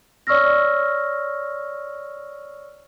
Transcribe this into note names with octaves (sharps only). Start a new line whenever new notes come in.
C#5 D5 C#6 E6 F6 A#6